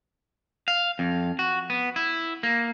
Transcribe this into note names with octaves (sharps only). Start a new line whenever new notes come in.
F5
F2
F#4
B3
E4
A#3